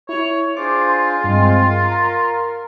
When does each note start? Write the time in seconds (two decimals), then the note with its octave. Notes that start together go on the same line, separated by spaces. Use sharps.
0.09 E4 C#5
0.57 D4 F4 G#4 C5 D6
0.90 C6
1.24 G2 G#3 C4
1.67 A#4
1.92 A#5